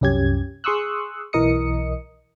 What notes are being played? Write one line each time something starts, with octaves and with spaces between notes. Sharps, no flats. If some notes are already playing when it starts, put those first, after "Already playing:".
C2 F#2 C#4 G4 G#6
G#4 C6 C#6 D#6 E6 F#6
B1 E3 A#4 D#5 D#6 C#7